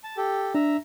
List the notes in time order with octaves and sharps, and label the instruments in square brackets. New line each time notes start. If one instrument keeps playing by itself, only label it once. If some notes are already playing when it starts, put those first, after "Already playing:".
[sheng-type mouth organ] A5
G4 A4
[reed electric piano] D4 [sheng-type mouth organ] E5 A#5